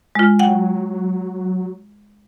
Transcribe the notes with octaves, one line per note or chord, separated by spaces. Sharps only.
G#3 F4
F#3 F#5 G5